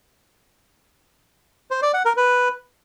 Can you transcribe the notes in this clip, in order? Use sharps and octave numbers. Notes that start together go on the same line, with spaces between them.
C5
D5
F#5
A#4
B4